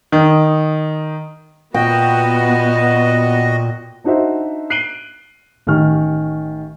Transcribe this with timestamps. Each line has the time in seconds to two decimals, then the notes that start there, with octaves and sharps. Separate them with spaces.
0.12 D#3
1.74 A#2 B3 F#4 D#5 G5
4.04 D4 D#4 F#4 C5 E5
4.70 F#6 C7 D7 D#7 F#7 G7
5.67 A1 D#3 G4 G#5 C#6 F6